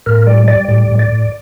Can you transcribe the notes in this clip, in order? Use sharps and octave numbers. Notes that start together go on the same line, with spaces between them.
A2 A#4
G3 D5
G3 D5
A2 D5
A2
D5
A2